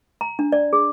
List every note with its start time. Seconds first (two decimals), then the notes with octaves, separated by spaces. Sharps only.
0.21 A#5
0.39 D4
0.52 D5
0.73 G#4